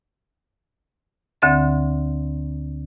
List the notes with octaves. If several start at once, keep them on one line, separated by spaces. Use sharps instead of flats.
D2 D3 C4 E5 A6